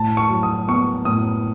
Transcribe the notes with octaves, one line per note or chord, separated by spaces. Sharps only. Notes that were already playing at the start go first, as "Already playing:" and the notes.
Already playing: A2 A5
C#6
F#3
D#6
B3 C#6
A2 D#6